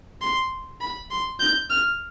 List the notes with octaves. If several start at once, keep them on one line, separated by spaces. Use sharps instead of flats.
C6
B5
C6
G6
F6